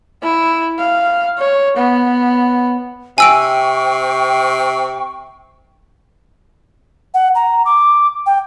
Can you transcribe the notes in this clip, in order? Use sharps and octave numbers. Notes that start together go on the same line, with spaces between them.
E4
F5
C#5
B3
C3 G5 G#5 C#6 E6 D7
F#5
A#5
D6
G5